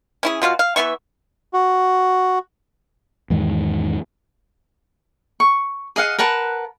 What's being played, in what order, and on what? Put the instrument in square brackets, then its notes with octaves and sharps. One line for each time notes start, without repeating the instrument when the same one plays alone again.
[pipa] C#4 E4 G#4
B2 F4 F#4 F5
F5
E3 B3 E5 C#6
[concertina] F#4
[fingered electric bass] E2 G#2 D#3
[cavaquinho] C#6
G#4 D#5 F5 F#5
A#4 B4 F#5 A5